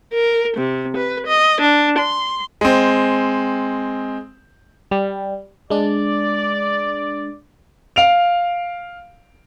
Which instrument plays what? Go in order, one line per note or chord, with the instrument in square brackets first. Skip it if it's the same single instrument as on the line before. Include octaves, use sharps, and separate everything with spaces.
[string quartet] A#4
C3
B4
D#5
D4
C6
[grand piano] G#3 C4
[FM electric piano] G3
[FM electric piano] G#3 D4 [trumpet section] D5
[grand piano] F5 D7 F7